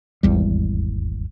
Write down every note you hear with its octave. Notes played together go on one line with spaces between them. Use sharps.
D#1 G#1 E2 G3